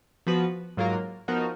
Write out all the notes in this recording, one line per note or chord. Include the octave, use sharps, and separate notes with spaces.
F3 B3 F#4 B4
G#2 F#3 A#3 F4 A#4
F3 B3 D#4 F#4 A#4